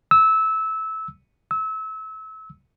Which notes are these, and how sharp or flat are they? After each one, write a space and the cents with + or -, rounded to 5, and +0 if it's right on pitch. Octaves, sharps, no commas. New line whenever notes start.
E6 -20
E6 -30